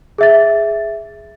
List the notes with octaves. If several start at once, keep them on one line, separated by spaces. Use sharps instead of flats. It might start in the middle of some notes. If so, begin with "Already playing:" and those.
G#4 E5 A6